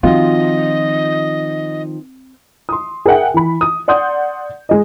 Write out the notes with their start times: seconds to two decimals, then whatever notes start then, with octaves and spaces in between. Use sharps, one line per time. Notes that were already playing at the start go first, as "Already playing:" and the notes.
0.03 D#3 F3 C4 F4 F#4 D#5
2.69 C6 D#6
3.05 G#4 A#4 E5 F#5 G5
3.34 E3 B5
3.61 D#6
3.88 D5 F#5 C6 D#6 G6
4.69 G#3 D#5